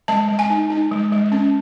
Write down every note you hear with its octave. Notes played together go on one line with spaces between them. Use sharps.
G#3 A5
G#3
G#5
D#4
D#4
G#3
G#3
C#4